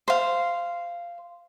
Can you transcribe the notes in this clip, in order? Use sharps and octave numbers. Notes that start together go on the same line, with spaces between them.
C5 F5